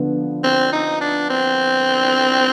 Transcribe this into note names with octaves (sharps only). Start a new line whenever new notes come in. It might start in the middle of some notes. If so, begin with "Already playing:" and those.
Already playing: D3 F3 B3 F4
C4
D#4
D4
C4